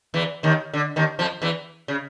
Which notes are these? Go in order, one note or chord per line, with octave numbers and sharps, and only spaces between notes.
E2 E3
D#2 D#3
D3
D#2 D#3
F2 F3
E2 E3
C#3